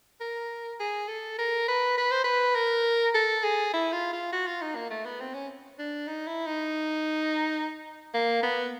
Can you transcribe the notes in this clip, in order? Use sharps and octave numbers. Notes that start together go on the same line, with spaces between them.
A#4
G#4
A4
A#4
B4
B4
C5
B4
A#4
A4
G#4
E4
F4
F4
F#4
F4
D#4
A#3
A3
B3
C4
C#4
D4
D#4
E4
D#4
A#3
B3